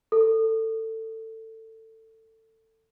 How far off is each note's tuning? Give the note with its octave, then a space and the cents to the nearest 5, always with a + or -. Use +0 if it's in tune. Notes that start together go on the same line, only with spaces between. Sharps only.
A4 +20